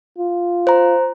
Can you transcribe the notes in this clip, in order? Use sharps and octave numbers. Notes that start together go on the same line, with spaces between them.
F4
C5 A#5